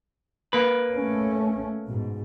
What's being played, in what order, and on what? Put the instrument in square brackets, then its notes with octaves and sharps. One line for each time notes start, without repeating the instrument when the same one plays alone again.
[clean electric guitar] A#3 B4
[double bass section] A3 C#4
G#2 B2